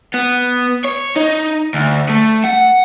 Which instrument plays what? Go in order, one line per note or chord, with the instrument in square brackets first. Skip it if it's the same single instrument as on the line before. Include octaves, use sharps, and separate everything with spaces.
[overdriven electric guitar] B3
C#5
D#4
D2
A3
F#5